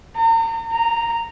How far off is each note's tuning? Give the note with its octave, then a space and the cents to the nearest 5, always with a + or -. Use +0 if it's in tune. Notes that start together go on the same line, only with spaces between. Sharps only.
A#5 -40
A#5 -5